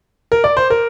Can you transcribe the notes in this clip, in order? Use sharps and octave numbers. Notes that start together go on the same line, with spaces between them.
A#4
D5
C5
A#4